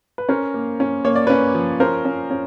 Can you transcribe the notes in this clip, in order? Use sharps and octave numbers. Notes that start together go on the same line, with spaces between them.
B4
C#4 A#4 C5
A#3
C#4
A#3 C#5
D5
C#4 B4 C#5
F3
C#4 A#4 C5
C#4
C#4